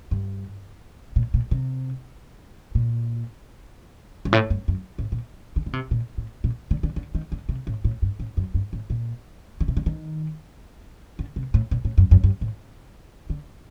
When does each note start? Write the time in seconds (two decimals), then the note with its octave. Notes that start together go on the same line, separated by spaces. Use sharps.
0.11 G2
1.16 A#2
1.34 A#2
1.51 C3
2.75 A#2
4.25 G2
4.33 A2
4.50 G2
4.68 F#2
4.98 A2
5.12 A#2
5.56 D3
5.66 D3
5.73 C3
5.91 A#2
6.18 A2
6.44 A#2
6.71 D3
6.83 D3
6.96 D3
7.15 D#3
7.32 D3
7.49 C3
7.67 A2
7.84 A2
8.02 G2
8.20 A2
8.37 F#2
8.54 G2
8.73 A2
8.90 A#2
9.61 D3
9.68 C3
9.77 D3
9.86 D#3
11.19 D3
11.36 C3
11.54 A2
11.71 A#2
11.85 A2
11.98 F#2
12.11 F#2
12.24 G2
12.41 A2
13.30 D3